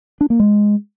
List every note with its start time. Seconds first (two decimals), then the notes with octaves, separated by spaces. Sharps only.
0.21 D4
0.30 A#3
0.40 G#3